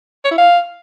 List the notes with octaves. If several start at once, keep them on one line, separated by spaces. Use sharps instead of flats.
C#5
E4
F5